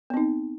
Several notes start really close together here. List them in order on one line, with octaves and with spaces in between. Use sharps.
B3 C4 D#4